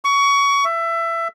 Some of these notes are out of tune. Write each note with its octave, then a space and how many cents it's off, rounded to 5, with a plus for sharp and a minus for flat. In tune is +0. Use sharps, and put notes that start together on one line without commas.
C#6 +25
E5 +20